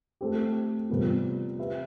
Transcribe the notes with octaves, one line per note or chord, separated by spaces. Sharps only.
A3 C4 G4
C3 G3 B3 F4
C4 G4 B4 E5